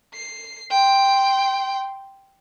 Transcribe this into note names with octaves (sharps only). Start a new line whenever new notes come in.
C7
G5 C6